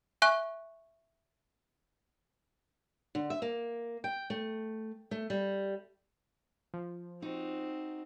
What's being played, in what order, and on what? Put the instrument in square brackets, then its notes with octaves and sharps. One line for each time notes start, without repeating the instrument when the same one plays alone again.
[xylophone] E5 G#5 C#6 F#6
[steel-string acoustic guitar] D3
E5
A#3
G5
A3
A3
G3
[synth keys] F3
[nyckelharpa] C4 [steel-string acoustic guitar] D#4 F#4